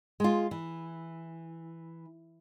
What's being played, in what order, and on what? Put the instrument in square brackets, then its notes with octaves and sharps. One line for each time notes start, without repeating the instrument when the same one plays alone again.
[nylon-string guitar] G#3 F4
E3